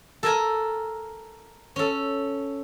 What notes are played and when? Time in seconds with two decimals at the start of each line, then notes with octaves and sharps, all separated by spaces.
0.23 A4 A#4 G#5
1.76 C#4 A4